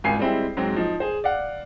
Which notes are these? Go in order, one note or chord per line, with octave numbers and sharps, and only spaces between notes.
G#1 C#2 G#5 C7
G3 G#3 C4 E4
G#2 F#3 C4
F3 D#4
G#4 C5
D5 F5 F#5